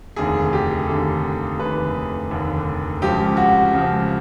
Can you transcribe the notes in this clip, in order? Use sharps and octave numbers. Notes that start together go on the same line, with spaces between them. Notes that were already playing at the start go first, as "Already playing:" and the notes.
F1 D#2 D3 G#4
G4
F1 D#2 D3 A4
F1 D#2 D3 B4
F1 D#2 D3
C#2 C#3 F3 G4
F#4
C#2 C#3 F3